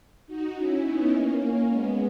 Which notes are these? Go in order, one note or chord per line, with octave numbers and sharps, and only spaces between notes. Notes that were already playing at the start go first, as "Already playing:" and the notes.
D#4 F#4
C#4 E4
B3 D#4
A#3 C#4
A#3 C#4
G#3 B3